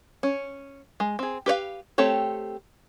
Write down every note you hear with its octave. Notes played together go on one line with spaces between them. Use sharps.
C#4
G#3
C4 G#4
G4 B4 C#5 F5
A3 C4 G4 A4 C#5